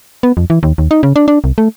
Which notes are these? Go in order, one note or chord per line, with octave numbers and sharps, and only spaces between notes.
B3
F2
E3
D#2
D#2
D#4
C#3
D4
D4
C2
A3